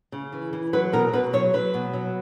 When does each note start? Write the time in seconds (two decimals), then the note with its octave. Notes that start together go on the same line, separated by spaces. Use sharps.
0.12 C#3
0.32 E3
0.53 E3
0.73 F#3 B4
0.93 B2 A#4
1.13 B2 B4
1.33 F#3 C#5
1.53 F#3 B4
1.74 B2
1.93 F#3